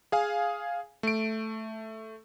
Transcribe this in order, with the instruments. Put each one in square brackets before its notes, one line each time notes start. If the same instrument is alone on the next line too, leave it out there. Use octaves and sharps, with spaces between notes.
[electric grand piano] G#4 F5 G#5
A3 D7